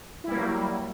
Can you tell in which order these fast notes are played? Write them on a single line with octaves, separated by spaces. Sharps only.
E4 G3 A#3 F#3